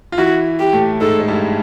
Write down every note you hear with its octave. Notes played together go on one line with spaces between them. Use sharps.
F4
E3 E4 F#4
G4
A2 A3
G#2 G#3 A4
G#3
G2 G3